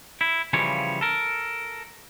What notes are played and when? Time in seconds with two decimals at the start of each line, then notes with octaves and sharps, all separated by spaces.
0.21 E4
0.53 C#3 E3 F3 G3 C#5
1.01 A4 A#4